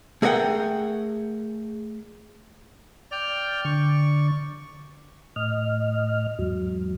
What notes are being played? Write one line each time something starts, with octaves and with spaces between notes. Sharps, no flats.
A3 G#4 A#4 D5 F#5 G5
D5 G5 F6
D3 C#6
A2 D#5 F6
E2 G#2 F#3